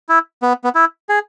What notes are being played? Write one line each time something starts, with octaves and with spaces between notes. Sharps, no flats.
E4
B3
B3
E4
G#4